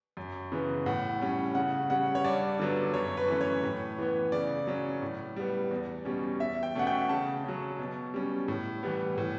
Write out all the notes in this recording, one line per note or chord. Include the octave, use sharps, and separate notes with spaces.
F#2
C#3 E3 B3
A2 F#5
G3 C#4
C#3 F#5
G3 C#4 F#5
C#5
G2 D5
D3 F#3 B3
F#2 C#5
B4
E3 A3 C#4
C#5
A2
E3 B3
C#3 D5
F#3 C#4
A2
G3 B3
E2
B2 G3 C#4
E2 E5
G5
B2 A3 C#4 F#5
G5
C#3 A5
F#3 C#4
B2
G3 C#4
A2
E3 G3 B3
A2